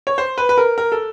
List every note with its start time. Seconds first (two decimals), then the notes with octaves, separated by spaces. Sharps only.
0.07 C#5
0.18 C5
0.38 B4
0.49 B4
0.58 A#4
0.78 A#4
0.92 A4